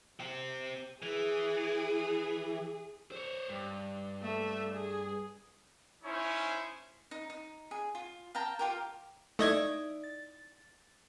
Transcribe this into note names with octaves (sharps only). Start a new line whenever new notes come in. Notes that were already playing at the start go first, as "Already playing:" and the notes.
C4 G4
E3 G#4
C5 C#5
G2
A3 E5
G#4
C#4 D#4 E4 C5 C#5 G#5
D#4
D#4
G#4
F4
F5 G5 A5 A#5
F4 G4 A#4
A3 D#4 E4 D5 D#5 G#6
A6